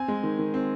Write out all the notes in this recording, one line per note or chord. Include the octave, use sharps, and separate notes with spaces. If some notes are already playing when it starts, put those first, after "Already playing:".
Already playing: C4 G#5
G#3
D#3
D#3
C4